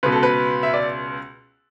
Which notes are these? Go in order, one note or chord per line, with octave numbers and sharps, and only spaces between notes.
C#2 B2 B4
A4
B4
E5
D5